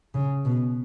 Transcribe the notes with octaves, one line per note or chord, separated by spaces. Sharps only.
C#3
B2